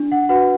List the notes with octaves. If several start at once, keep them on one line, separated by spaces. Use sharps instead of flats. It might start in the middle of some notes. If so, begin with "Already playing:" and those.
Already playing: D4
F#5
F#4 B4 F#5